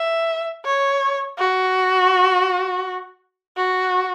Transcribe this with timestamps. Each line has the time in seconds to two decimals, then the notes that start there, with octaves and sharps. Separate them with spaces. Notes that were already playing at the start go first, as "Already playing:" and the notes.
Already playing: E5
0.65 C#5
1.39 F#4
3.57 F#4